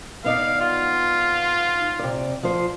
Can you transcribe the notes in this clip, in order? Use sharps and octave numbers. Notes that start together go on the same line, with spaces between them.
B3 D#4 D5 F5
F4
C3 D5
F3 C5